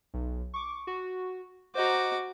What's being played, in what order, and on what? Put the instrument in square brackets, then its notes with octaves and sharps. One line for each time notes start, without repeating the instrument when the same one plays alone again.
[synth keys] B1
C#6 D6
F#4
[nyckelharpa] F#4 D6 [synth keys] C5 D#5 A#5